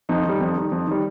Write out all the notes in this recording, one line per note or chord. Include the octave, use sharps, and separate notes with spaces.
F2 D#4
D#3 G3
F2
D#3 G3
F2
D#3 G3